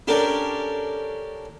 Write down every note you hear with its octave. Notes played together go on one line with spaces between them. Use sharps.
C#4 D4 G4 A4 A#4